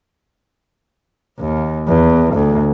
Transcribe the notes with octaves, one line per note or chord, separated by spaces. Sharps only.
D#2
E2
D2